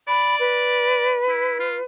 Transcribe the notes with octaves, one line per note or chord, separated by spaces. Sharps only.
D5 B5
B4
E4
F4